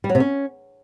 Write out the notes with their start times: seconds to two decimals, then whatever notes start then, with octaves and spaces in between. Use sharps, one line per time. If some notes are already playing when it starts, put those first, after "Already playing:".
0.04 G3
0.09 F#3
0.15 C3
0.20 C#4